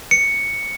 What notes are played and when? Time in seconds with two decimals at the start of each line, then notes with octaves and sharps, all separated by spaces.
0.11 C#7